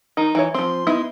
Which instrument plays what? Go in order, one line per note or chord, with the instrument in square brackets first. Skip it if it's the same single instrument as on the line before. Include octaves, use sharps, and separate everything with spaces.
[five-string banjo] D#3 [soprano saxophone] D#4
[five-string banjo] E3 E4 C#5
[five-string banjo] F3 C4 [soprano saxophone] C6
[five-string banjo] B3 D#4 E4